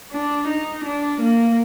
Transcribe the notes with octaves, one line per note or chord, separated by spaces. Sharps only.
D4
D#4
D4
A#3